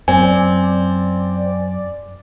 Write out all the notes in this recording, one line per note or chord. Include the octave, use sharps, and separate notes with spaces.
F#2 C4 D5 G#5